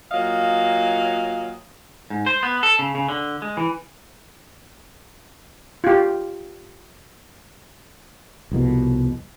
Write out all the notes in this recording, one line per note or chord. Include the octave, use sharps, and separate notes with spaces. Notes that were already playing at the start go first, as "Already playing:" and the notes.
A#2 F#3 D#5 F5
G#2
C5
B3
A4
C#3
C#3
D3
G#3
E3
F4 G4
C2 F2 B2